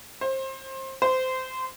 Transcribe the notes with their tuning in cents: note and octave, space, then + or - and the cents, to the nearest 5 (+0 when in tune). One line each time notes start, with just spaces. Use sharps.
C5 +25
C5 -20